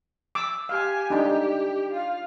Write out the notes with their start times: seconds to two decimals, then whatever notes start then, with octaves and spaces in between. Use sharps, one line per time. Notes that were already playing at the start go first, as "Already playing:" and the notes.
0.35 D6 E6
0.69 G4 F5 G#5
1.10 D4 D#4 G4 G5
1.92 F4 F5